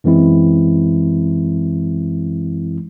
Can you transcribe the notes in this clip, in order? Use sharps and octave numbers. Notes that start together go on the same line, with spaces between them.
F#2 E3 G#3 C4 E4